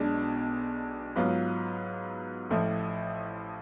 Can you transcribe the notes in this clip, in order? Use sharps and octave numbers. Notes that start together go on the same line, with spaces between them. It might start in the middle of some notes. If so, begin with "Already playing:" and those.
Already playing: B1 B2 G#3 D4
G#2 F#3 B3 F4
A1 A2 F3 A3 F4